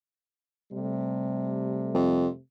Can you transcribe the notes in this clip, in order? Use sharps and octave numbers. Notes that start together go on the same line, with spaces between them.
C3 G3 A3
F2